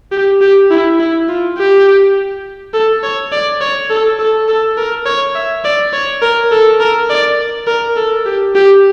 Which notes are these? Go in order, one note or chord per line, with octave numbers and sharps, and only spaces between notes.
G4
G4
E4
E4
F4
G4
A4
C#5
D5
C#5
A4
A4
A4
A#4
C#5
E5
D5
C#5
A#4
A4
A#4
D5
A#4
A4
G4
G4